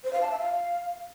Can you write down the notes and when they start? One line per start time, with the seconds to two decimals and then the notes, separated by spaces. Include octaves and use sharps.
0.04 C5
0.13 F5
0.22 A5
0.30 E5
0.39 F5